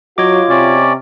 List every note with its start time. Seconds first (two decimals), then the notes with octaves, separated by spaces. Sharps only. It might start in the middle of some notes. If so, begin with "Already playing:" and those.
0.18 F#3 F4 F#4 C#5 D#5 D6
0.49 C3 C#4 D5